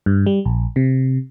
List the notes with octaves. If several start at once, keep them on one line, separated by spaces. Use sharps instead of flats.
G2
G3
A#1
C3